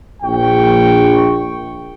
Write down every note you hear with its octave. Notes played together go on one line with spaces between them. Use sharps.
A#1 G5 C#6